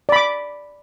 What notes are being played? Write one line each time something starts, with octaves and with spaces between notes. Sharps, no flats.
D5 B5 D6